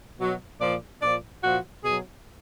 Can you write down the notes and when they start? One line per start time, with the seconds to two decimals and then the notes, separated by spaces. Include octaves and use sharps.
0.20 B2 F#3
0.61 A#2 F3 D5
1.02 A#2 F3 D5
1.43 A#2 F3 F#4
1.84 B2 F#3 G#4